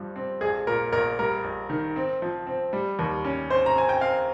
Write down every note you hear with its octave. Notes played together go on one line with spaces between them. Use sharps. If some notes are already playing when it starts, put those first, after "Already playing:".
Already playing: G2 F3 G3
C4
A#1 G#4
A#2 A#4
A#1 A#4
G3 A#4
A#1
D#3
C4
F3
C4
G3
D#2
C#4
C4 C5
A#5
C4 G#5
G5
C4 F5